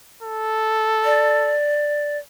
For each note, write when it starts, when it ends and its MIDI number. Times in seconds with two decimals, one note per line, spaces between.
0.23 1.56 69
1.05 2.18 74